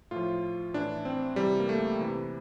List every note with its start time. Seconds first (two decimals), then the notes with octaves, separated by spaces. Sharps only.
0.11 A2 F3 F4
0.74 A2 E3 D4
1.05 C4
1.36 C3 E3 G3
1.60 A#3
1.69 A3
2.00 C3 E3